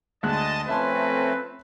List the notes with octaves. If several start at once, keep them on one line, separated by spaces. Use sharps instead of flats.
D2 G#3 D#5 A5 F#6
F3 A3 C4 C#4 B4 E5 A5 C6